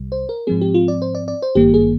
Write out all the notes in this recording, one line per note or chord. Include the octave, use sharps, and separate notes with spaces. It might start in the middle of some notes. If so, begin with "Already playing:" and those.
Already playing: C2 C3 G3
C5
A#4
G#2 F3 C4 G#4
G4
F4
D5
C5
D5
D5
C5
G#1 G2 D#3 A#3 G4
G#4